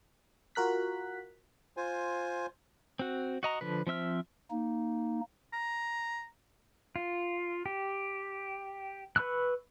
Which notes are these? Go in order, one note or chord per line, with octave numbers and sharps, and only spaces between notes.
F4 F#4 A#4 F#6 B6
F4 C5 G#5
C4 F#4
F#4 D#5 A#5
D3 F3 B4
F3 C4 E5 F6
A#3 D#4
A#5
F4
G4
B4 B5 C#6 E6 F#6